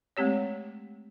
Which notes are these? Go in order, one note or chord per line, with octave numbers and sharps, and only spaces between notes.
G#3 A3 C4 G4 C#5